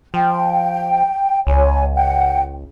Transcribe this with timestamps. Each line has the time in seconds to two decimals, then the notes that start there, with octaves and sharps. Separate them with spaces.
0.14 F3 G5
1.47 C#2 C#5 G#5
1.95 F#5 G5